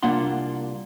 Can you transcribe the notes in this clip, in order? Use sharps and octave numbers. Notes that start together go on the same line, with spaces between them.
C2 A#3 D4 F4 F#5 C6